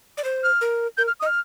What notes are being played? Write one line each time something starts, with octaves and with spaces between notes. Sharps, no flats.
D5
C5
F6
A#4
A#4 G6
F6
D#5 D#6
F6